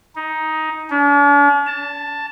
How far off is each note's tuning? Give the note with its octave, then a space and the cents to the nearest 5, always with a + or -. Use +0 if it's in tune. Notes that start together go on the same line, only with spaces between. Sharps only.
D#4 +10
D4 -45
A5 +5